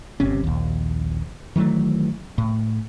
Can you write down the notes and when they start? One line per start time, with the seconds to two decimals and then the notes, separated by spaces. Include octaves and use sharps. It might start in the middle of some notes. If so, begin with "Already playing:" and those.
0.20 G1 C3 C#4
0.44 A#1 D#2
1.56 D#3 E3 F#3 A3
2.38 A2